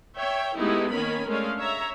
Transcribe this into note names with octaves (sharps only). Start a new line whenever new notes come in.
C#5 E5 G5
G#3 A3 B3 D#4 E4 G4
D#3 A#3 C#4 A#4 B5
G#3 A3 C#4 D4 F5
C#5 E5 A#5